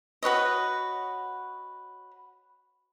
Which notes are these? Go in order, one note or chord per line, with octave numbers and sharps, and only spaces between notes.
F#4 B4 C#5 D#5